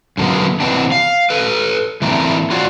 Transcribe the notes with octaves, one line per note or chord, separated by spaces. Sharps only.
F#2 D3 F#3 A#3 B3
C3 E3 B3 C4 D4
F5
A4 B4
E3 A3 A#3 C4 D4 E4
F4 F#4 C#5 D5 F5